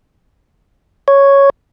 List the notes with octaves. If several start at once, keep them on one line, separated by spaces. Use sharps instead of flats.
C#5